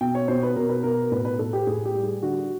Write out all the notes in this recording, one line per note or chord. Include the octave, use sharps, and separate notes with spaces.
B2 G5
C#5
B2 C5
B4
B2 A#4
B4
B2 A#4
A2 B4
B4
A2 A4
G4
A2 G#4
G4
G3
G#4
D3 F#4